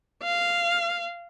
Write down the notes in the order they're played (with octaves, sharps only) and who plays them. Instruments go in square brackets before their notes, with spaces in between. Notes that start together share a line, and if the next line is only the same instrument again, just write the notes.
[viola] F5